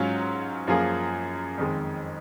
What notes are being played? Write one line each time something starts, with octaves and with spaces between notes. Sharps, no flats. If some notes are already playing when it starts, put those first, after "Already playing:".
Already playing: G#2 F#3 C#4 F4
F#2 F3 A#3 F4 G#4
F2 D#3 G#3